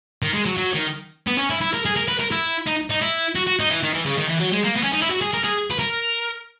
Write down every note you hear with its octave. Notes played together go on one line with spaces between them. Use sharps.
D#3
G#3
F#3
F#3
D#3
B3
C#4
E4
E4
A#4
G#4
A#4
B4
A#4
E4
D#4
D#4
E4
F#4
F#4
D#4
E3
D#3
E3
C#3
D#3
E3
F#3
G#3
A#3
B3
C#4
D#4
E4
F#4
G#4
A#4
G#4
B4
A#4